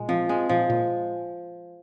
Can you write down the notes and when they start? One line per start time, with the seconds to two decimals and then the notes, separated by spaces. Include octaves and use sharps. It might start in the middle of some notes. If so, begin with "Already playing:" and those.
Already playing: A#2 G#3
0.08 F3 C4
0.29 G#3 C4
0.49 A#2 F3
0.70 A#2